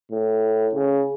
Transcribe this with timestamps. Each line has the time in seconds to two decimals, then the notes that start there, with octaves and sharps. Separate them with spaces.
0.12 A2
0.75 C#3